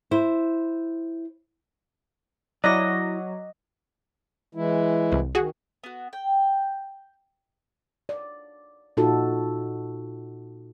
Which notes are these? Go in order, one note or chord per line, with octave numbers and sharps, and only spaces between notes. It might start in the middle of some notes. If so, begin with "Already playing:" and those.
E4 C5
F#3 E4 D5 D#5 D6 F#6 A#6
E3 G#3 E4
C2
D#3 F#4 G#4
B3 F#4
G5
D5
A#2 D#4 F4 F#4 A4